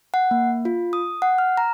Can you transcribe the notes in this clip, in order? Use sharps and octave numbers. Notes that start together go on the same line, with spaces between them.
F#5
A#3
F4
D#6
F#5
F6
A#5